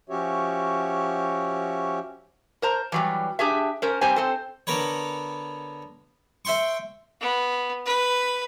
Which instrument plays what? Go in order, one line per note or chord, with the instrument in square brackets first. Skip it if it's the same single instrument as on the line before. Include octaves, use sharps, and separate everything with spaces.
[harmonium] F3 C#4 F#4 G4 C#5 E5
[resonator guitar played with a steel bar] A#4 C5 A#5
E3 F#3 G3
D4 G4 G#4 E5
C#4 A#4 C5
C3 G3 C4 G4 C5 G#5
C4 A4 C5
[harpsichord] D3 B3 A#4 B4 C#5
C5 E5 G5 C6 C#6
[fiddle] B3
B4